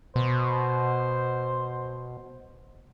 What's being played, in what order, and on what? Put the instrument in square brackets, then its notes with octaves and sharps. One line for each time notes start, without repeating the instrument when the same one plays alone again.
[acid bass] B2 [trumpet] C5